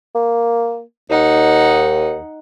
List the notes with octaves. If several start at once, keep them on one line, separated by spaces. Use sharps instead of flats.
A#3
D#2 D#4 F#5